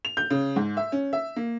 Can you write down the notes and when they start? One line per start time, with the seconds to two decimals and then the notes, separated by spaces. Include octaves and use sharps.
0.05 F7
0.17 G6
0.30 C#3
0.56 G#2
0.77 E5
0.92 C#4
1.13 E5
1.36 A#3